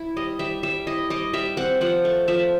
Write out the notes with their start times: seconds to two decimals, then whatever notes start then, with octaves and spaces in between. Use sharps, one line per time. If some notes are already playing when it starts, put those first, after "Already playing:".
Already playing: E4
0.16 G3 D#5
0.39 G3 E5
0.63 G3 E5
0.87 E4 D#5
1.10 G3 D#5
1.33 G3 E5
1.57 C4 F#5
1.81 F3 F#5
2.05 A3
2.28 F3 E5